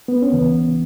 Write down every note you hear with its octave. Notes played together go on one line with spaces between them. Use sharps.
B3
C#4
D2 C#3 E3 B3